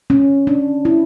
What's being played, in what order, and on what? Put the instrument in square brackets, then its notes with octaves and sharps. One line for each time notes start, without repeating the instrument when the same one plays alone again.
[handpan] C#4
D4
E4